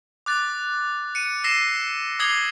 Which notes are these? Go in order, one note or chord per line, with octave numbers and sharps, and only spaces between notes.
D6 F#6 A6
C#7 D#7
E6 A#6 C7 E7
D6 D#6 G#6 C7 F#7 G7